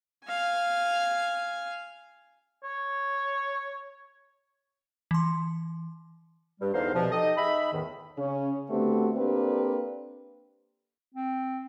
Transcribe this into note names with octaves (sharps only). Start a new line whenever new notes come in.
F5 G#5
C#5
E3 C6
G2 G3
E2 G#2 D3 D#4 C5 F5
C2 B2 F3
D#4 G4 A4 D#5
D#4 G#4 E5 B5
E2 A2 D#3
C#3 C#4 C#5
D3 A3 B3 C4 F#4 G4
A#3 C4 D4 G4 A4 B4
C4